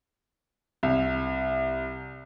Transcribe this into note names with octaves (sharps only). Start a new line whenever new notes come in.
C2